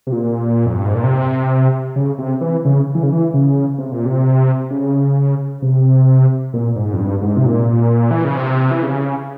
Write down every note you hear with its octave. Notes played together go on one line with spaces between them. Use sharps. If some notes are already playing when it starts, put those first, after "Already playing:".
C3
A#2
F2
G2
G#2
A#2
C3
C#3
C3
E3
C#3
E3
C#3
E3
C#3
C3
A#2
C3
C#3
C3
A#2
G#2
F2
G2
G#2
C3
A#2
E3
C#3
C3
E3
C#3